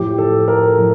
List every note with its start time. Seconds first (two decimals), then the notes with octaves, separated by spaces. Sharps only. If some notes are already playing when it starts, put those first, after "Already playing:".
Already playing: A2 F3 G4
0.18 A4
0.48 A#4
0.77 A2 F3